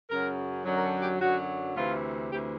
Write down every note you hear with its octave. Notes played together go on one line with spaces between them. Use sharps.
F#2 C#3 F#3 A#4
F#2 D3 F#3
A#4
A4
G4
F#2 D3 F#3 F#4
D2 C3 E3 F4
D2 C3 E3 G4